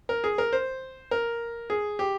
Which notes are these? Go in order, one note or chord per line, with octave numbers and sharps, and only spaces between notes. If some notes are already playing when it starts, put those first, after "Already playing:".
A#4
G#4
A#4
C5
A#4
G#4
G4